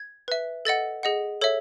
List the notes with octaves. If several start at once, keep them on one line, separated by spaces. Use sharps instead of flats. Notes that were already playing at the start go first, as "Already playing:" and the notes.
Already playing: G#6
B4 E5
A4 D#5 F#5 A6
G#4 D#5 F#5
A4 C#5 E5